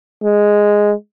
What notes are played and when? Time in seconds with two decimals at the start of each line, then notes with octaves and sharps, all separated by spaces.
0.24 G#3